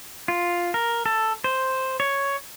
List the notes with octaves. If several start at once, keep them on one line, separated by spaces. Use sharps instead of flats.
F4
A#4
A4
C5
C#5